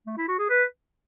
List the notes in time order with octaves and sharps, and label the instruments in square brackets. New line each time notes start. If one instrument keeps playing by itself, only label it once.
[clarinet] A3
E4
F#4
G#4
B4